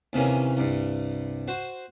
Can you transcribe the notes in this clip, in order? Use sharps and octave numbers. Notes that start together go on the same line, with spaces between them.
D#2 C3 E3 A#3 C#4
C2 G2
F#4 C5